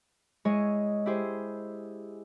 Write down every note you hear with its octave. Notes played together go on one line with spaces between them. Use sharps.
G#3 E4 G#4 C#5 D#5
E4 G4 G#4 C5